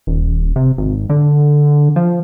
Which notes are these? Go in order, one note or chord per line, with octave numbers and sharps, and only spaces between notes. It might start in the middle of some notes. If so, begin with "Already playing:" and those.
D#1
C3
G#1
D3
F3